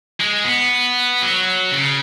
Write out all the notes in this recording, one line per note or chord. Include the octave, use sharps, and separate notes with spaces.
G#3
B3
F#3
C#3